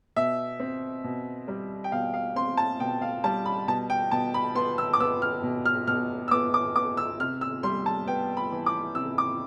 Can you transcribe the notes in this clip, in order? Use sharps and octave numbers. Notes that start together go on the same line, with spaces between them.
B2 E5
C4
B2
G3
G5
B2 F5
F5
C4 C6
A5
B2 G5
F5
G3 A5
B5
B2 A5
G5
B2 A5
B5
B3 C6
E6
D6
B3 E6
F6
B2
F6
B2 F6
E6
B3 D6
D6
B3 D6
E6
C3 F6
E6
G3 C6
A5
B3 G5
B5
E3
D6
C3 E6
D6